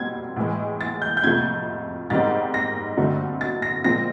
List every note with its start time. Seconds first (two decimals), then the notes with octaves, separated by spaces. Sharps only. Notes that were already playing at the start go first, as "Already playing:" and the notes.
Already playing: B2 G3 C4 G#6
0.36 A2 E3 G#3
0.81 A6
1.02 G6
1.17 G6
1.23 F2 C3 F3 A3 G#6
2.10 G#2 D#3 G3 C4 A6
2.54 A#6
2.97 G2 D3 F#3 A3 C4
3.41 A6
3.62 A#6
3.84 A#2 F3 G#3 C4 A#6